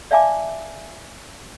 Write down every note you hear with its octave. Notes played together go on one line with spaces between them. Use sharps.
D5 E5 F5 G#5 A5 D6